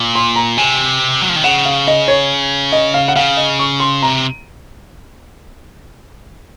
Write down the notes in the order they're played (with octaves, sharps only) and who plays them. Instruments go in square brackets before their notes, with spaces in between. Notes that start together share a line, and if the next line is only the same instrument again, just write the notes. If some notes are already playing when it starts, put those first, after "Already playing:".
Already playing: [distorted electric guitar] A#2
[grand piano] C6
A#5
[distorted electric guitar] C3 [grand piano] G#5
[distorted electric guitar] F#3
F3
D#3
[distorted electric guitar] C#3 [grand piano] F#5
[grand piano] F5
D#5
C#5
D#5
F5
F#5
[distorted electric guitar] C#3 [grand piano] F5
[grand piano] D#5
C#6
C6
[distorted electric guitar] C3 [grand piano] A#5